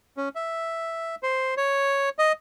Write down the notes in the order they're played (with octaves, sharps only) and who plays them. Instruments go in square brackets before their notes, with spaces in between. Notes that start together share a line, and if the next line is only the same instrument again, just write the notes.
[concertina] C#4
E5
C5
C#5
D#5